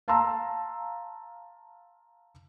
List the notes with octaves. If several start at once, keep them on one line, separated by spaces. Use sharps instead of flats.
F5 A5 A#5 C6 E6